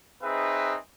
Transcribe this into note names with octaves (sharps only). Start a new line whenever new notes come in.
C4 D#4 G#4 B4 E5